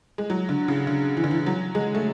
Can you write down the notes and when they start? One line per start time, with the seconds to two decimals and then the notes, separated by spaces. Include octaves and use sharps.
0.18 G#3
0.30 F#3
0.49 D3
0.68 C#3
0.87 D3
1.17 E3
1.24 D3
1.31 E3
1.46 F#3
1.75 G#3
1.95 A3